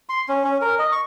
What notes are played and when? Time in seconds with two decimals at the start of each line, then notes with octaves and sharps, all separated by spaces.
0.09 C6
0.29 C#4
0.44 C#4
0.61 A#4
0.79 D#5
0.92 C#6